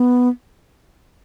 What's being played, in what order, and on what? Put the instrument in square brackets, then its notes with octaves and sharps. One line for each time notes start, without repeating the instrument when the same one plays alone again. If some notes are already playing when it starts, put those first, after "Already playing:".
Already playing: [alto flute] B3